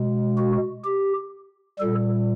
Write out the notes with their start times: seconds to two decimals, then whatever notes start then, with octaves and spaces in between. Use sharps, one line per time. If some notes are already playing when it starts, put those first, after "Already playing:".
Already playing: B2 G#3
0.38 F#4
0.84 G4
1.79 A#2 G3 A4